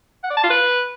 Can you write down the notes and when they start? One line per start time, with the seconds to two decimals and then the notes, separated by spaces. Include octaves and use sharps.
0.24 F#5
0.30 D5
0.37 A5
0.44 F4
0.50 B4